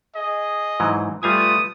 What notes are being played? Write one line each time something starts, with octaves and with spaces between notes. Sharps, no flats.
G#4 D#5
G#2 E3 F#3
G3 A3 F4 B4 F5 G#5 D#6